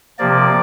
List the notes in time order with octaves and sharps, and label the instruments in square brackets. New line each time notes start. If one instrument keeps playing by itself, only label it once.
[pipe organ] C3 F3 A#3 D5